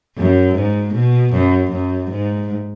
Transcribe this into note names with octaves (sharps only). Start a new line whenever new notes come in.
F#2
G#2
B2
F#2
F#2
G#2